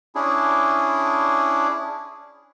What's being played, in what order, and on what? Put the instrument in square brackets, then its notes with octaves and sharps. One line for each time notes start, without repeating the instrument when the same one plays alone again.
[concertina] C#4 D4 E4 G#4